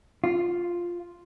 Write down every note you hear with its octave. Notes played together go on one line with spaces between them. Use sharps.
F4